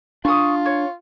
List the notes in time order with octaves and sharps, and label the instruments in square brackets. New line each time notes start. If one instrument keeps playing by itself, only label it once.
[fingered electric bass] D4 [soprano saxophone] F4 [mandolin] C#6 D#6
[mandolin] C#5